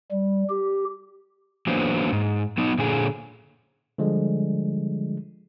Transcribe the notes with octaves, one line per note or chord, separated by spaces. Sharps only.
G3
G4
E3 F#3 A#3 B3 D4 C5
G#2
F#3 B3 D#4
A#2 D3 G#4
D3 F3 G3 G#3